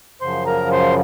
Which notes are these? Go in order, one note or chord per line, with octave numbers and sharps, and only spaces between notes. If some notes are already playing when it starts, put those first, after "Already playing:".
F#2 C#3 F3 C5 C6
A#4 A#5
C5 C6